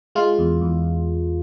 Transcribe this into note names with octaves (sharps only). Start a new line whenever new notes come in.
G#3 F4
E2
E2